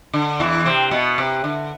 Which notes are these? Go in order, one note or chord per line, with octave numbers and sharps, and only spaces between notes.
D3
E2 E3
C3 C4
B2 B3
C3
D3